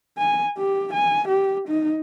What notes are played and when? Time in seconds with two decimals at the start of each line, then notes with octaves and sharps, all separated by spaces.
0.18 G#5
0.58 G4
0.94 G#5
1.28 G4
1.68 D#4